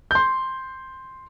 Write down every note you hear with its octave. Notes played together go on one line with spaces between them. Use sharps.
C6 G6